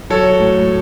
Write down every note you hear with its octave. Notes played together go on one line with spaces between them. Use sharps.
F#3 A4 C#5
A2